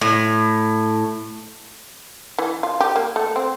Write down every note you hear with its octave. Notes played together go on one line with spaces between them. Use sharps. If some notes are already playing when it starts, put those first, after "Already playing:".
A2
E3
F4
G4
A#3
A3
C4